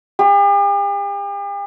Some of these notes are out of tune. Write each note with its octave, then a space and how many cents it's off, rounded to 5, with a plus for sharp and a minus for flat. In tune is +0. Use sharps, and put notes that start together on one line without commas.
G4 +45